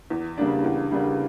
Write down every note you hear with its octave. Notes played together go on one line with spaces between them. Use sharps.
E2
C#3 G3 A#3 D4
E2
C#3 G3 A#3 D4